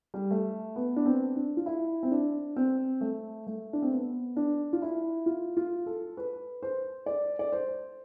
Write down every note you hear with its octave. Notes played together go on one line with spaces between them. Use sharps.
G3
A3
B3
D4
C4
D4
F4
E4
C4
D4
C4
A3
A3
D4
C4
B3
D4
F4
E4
F4
F4
A4
B4
C5
D5
D5
C5